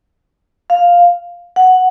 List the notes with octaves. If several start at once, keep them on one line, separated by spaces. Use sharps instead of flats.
F5
F#5